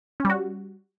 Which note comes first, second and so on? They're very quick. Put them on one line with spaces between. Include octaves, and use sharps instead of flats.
C#4 G3 F#4